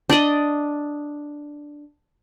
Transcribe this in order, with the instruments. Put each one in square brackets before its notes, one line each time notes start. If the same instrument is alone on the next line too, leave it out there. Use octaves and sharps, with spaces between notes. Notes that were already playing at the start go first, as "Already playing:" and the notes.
[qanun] D4 D5 D#5